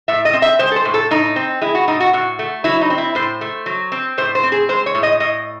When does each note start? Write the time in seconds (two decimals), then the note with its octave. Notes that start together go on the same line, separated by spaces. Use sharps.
0.08 A2 E5
0.25 D#5
0.33 C4
0.42 E5
0.59 G#3 C5
0.71 A4
0.76 C5
0.85 A2
0.94 A4
1.11 A2 D#4
1.36 C4
1.61 G#3 E4
1.75 F#4
1.88 A2 D#4
2.00 F#4
2.13 A2 F#4
2.39 A3
2.64 F#3 E4
2.81 D#4
2.90 C4
2.98 E4
3.15 A2 C5
3.41 A3
3.66 F#3
3.92 C4
4.18 A2 C5
4.35 C5
4.43 C4
4.52 G#4
4.69 G#3 C5
4.86 C#5
4.95 A2
5.03 D#5
5.20 A2 D#5